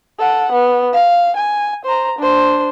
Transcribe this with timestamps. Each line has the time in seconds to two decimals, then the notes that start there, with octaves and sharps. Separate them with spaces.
0.19 A4 F#5
0.52 B3
0.93 F5
1.36 G#5
1.85 C5 A#5
2.18 D4 C5